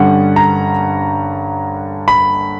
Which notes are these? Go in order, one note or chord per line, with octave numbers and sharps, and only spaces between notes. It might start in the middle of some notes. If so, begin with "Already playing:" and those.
Already playing: G2 D3 G3 C#4 F#5
A#5
B5